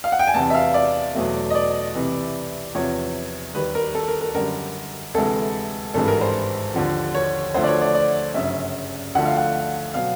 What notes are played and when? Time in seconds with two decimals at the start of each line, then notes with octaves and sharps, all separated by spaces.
0.04 F5
0.12 F#5
0.19 G5
0.27 G#5
0.34 E2 C3 E3 A5
0.50 E5
0.55 F5
0.74 D5
1.15 E2 B2 F#3 A3
1.50 D#5
1.55 D5
1.95 C2 C3 E3
2.75 E2 C3 F3 C#5
3.55 D#2 D#3 G3 B4
3.75 A#4
3.95 A4
4.08 A#4
4.21 A#4
4.34 F#2 D3 G3 A#4
5.14 D2 C3 E3 G#3 A4
5.94 G#1 G2 E3 G#3 A4
6.08 A#4
6.21 C5
6.74 D#2 D3 F3
7.15 C#5
7.54 D2 D3 F3 A3 C5
7.63 D5
7.68 C#5
7.81 D5
7.94 D5
8.34 G1 F#2 C#3 E5
9.15 D2 D3 F3 A3 F#5
9.25 F5
9.37 F#5
9.94 B2 F#3 F5